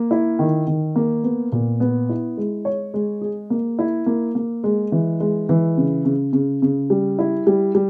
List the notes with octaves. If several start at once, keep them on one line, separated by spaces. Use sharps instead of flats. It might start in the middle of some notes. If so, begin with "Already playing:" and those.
Already playing: A#3
E4
D#3
D#3
A#3
B3
A#2
B3
E4
G#3
C#5
G#3
G#4
A#3
E4
A#3
A#3
G#3
E3
G#3
E3
C#3
C#3
C#3
C#3
G3
E4
G3
G3